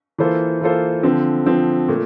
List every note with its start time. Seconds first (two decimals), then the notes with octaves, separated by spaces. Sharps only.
0.18 E3 A#3 F4 A4 C5
0.61 E3 A#3 F4 A4 C5
1.03 D3 F3 C4
1.46 D3 F3 C4
1.88 A#2 A3